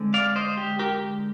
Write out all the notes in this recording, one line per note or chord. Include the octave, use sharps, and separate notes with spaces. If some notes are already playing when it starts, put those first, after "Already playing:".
Already playing: D3 G#3 C4
D5 F5
C5 D#5
G4
G4 A#4